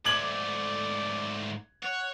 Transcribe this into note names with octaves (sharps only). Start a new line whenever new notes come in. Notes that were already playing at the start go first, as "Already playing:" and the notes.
G#2 A3 D5 D6 G#6 F#7
C#5 F#5